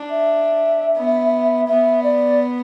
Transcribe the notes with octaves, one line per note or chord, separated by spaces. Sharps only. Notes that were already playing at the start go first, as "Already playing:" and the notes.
Already playing: D4
E5
B3
B3 E5
D5